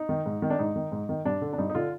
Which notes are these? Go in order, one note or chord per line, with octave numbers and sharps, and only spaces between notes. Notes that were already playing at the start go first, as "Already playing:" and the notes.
Already playing: D#4
D#3
G#2
D#3
D4
G#2 D#4
D#3
G#2
D#3
G2 D4
D3
D4
G2 D#4
D#4
D3 F4